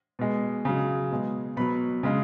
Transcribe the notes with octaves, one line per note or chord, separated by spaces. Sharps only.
B2 G#3
C#3 F#3
B2 G#3
B2 F#3 B5
C#3 G#3